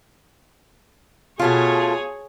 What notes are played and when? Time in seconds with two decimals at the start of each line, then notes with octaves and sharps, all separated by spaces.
1.39 B2 A3 F4 G#4 C#5